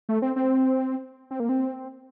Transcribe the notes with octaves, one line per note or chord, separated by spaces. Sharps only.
A3
C4
C4
C4
A#3
C4